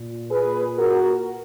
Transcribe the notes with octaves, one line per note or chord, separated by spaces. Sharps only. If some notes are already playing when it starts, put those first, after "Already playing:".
Already playing: A#2
G#4 B4
F#4 A#4